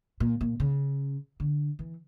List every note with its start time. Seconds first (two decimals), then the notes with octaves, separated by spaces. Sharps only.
0.20 A#2
0.41 A#2
0.60 C#3
1.40 D3
1.79 E3